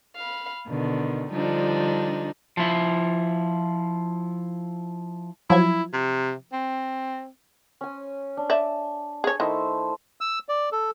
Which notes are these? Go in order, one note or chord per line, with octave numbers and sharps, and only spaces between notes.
F5 B5
B2 D3 D#3
D3 F3 G3 D4 D#4
F3 E4
F3 F#3 E4 G#6
C3
C4
C#4 G#5
D4
D5 E5
G#4 C#5
D#3 A3 E4 C5
E6
D5
A4